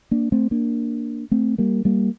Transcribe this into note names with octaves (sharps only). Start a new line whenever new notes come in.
A#3 D4
A3 C4
A#3 D4
A3 C4
G3 A#3
G3 A#3